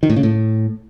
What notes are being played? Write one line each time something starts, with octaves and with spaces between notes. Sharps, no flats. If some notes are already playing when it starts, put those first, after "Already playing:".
D#3
A2
C#3
A2